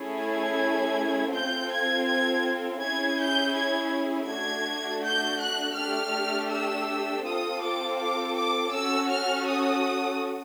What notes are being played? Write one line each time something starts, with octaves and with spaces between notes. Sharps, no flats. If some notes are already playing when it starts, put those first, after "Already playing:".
Already playing: A3 C#4 E4 G#4
G#6
C4 F4 A4 G6
G#6
G#6
C#4 E4 G#4 G#6
G6
G#6
A3 D4 F#4 G#6
G6
F#6
A3 D4 G4 F6
E6
C4 F4 A4 D#6
D6
D6
D6
C#4 F#4 A4 E6
F6
D#6